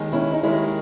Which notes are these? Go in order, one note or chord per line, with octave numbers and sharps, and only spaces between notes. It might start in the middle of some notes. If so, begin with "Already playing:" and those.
Already playing: D#2 D#3 G#3
C#4 E4
D#4
D#2 D#3 G#3 C#4 E4